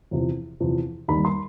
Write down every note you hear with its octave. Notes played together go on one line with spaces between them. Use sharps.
E2 C3 F3
E2 C3 F3
D#2 D#3 G3 B5
C6